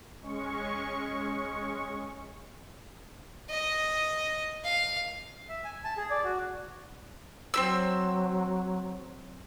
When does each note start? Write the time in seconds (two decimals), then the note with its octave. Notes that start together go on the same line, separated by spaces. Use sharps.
0.22 G#3 C#4 C#6
3.50 D#5
4.64 F5
5.49 E5
5.64 G#5
5.84 A5
5.97 G#4
6.10 D5
6.24 F#4
7.54 F#3 C4 G4 E6